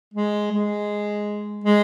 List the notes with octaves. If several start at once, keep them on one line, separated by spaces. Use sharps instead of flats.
G#3
G#3
G#3